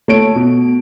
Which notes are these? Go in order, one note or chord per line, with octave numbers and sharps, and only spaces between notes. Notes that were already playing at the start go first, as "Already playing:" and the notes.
A3 C#5 D7
B2